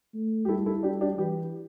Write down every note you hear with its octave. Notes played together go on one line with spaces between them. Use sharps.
A3
G4
G3 E4 A4
E4 A4
D4 G4
D4 G4
E3 G4 B4